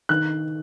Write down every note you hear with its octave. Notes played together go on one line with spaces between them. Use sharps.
D#3 F#6